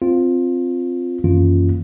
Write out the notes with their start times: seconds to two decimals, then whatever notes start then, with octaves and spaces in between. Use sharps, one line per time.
0.02 C4 F4
1.24 F#2 D#3 E3 A#3 C#4 F4